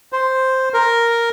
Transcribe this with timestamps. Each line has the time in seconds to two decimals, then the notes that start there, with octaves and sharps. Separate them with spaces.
0.12 C5
0.74 A#4